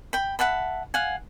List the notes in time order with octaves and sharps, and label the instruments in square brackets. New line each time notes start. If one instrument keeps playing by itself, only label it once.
[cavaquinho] G5 B5
E5 F#5 A5 B5
F5 F#5 G#5